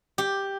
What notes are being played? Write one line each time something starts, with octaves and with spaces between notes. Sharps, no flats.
G4